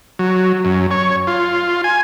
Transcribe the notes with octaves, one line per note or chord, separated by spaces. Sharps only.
F#3
F#2
C#5
F4
G#5